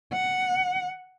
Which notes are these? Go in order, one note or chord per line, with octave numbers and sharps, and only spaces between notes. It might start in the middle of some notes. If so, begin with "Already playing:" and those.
F#5